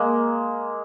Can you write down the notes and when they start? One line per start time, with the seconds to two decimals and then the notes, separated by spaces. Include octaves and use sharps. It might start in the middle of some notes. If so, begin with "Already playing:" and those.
Already playing: G#3 A#3